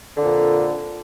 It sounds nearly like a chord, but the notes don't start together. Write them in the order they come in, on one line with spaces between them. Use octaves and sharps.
D3 F2 A#2